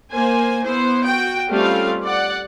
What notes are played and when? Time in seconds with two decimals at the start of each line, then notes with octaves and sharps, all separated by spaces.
0.12 A#3 C5 G#5
0.65 B3 E4 C5
1.04 F#4 G5
1.49 G3 A3 C4 C#4 F4 F5
2.03 D5 F#5